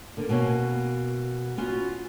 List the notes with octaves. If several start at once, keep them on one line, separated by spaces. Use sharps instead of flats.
D3 A#3
B2 A#3 C#4
B3 C#4 F4 F#4